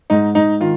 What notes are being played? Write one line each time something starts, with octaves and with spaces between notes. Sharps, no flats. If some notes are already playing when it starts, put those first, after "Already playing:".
G#2 D#4
G#2 D#4
D#3 F4